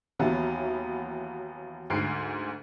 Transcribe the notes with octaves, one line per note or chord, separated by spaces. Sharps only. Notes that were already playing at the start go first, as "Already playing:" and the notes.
D#2 E3 F#3 B3
D2 G#2 C7 D7